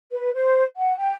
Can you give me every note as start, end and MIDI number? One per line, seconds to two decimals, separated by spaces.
0.11 0.32 71
0.34 0.64 72
0.77 0.95 78
0.99 1.15 79